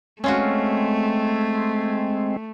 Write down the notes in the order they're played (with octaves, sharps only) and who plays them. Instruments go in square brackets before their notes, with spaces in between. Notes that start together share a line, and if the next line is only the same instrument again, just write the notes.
[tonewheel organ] G#3 C4 [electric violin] A3 [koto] C#4 F4 F#4